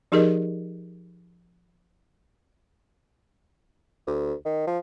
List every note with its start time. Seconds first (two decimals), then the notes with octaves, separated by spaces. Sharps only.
0.12 F3 D#4 G4 G#4 A#4 D#5
4.07 D2
4.45 D#3
4.67 F3